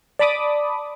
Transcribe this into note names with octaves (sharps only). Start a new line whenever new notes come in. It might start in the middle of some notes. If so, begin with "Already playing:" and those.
D5 A5 B5 D6 D#6